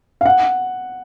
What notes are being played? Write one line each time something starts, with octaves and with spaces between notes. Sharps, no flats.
F5
F#5